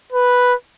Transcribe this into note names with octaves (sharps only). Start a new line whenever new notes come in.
B4